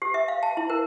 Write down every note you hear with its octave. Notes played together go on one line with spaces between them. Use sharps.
G4
E5
F5
A5
E4
A#4